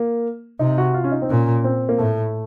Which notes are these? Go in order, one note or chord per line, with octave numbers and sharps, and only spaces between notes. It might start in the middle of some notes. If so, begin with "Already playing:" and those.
Already playing: A#3
C3 D#4
F#4
F4
C#4
D#4
C4
A#2 C#4
C4
A#3
A2 A3